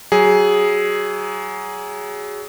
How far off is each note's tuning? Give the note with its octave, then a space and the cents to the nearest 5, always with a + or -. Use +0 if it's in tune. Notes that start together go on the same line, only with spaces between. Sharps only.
F#3 +25 G#4 +0